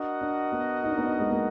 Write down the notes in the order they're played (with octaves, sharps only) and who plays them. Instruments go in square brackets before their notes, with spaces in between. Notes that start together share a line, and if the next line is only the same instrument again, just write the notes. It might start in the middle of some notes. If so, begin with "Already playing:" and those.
Already playing: [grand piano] D4 [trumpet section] F#4 A#4 D#5 F#5
[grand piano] D4
B3
D#4
D4
B3
D4
G#3
A#3